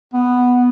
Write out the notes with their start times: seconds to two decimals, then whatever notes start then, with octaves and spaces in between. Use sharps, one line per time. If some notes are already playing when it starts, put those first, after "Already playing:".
0.14 B3